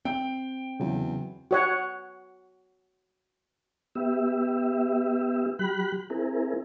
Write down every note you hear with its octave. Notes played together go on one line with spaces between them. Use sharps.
C4 G5
E2 C#3 F#3
F#4 C#5 F#5
B3 G4 E5
F#3 G4 B5 F#6
C4 E4 G#4 A#4